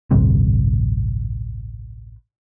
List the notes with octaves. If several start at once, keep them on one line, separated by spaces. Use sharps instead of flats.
A1 D2 G2 C3